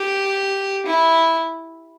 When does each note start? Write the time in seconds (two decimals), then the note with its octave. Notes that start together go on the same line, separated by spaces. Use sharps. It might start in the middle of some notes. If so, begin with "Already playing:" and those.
Already playing: G4
0.86 E4